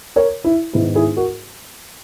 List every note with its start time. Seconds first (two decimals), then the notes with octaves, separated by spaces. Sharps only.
0.16 A#4 C#5
0.44 E4
0.73 G#2 D#3 G#3 B3 D#4 E4
0.95 E4 G#4
1.17 F#4 A#4